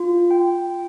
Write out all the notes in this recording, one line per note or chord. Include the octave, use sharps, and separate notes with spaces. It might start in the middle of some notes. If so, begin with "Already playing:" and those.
Already playing: F4
G5